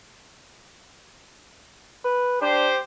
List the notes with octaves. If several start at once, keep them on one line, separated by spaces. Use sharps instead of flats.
B4
D4 G4 C5